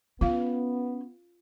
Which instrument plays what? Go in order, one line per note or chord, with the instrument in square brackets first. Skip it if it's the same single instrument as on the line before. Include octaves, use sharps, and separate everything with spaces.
[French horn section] B3 [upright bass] C#4 [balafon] F4 F5